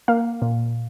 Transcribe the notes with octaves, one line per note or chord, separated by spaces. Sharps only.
A#3 F5
A#2